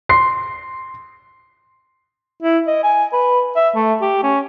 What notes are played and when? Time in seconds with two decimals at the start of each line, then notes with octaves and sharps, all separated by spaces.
0.09 C6 C7
2.42 E4
2.67 D#5
2.84 G#5
3.13 B4
3.56 E5
3.75 A3
4.02 G4
4.24 C#4